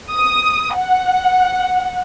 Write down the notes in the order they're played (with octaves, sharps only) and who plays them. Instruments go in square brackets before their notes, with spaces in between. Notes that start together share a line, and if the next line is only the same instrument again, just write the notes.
[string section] D#6
F#5